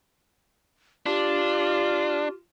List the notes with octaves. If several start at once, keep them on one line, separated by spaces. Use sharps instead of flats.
D4 F4 G4